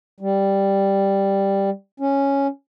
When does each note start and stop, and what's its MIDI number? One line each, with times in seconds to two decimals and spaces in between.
0.20 1.70 55
2.00 2.47 61